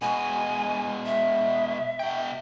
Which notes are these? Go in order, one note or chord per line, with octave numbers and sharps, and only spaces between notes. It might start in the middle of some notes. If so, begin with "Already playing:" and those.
B2 G#3 G#5
E5
B2 G5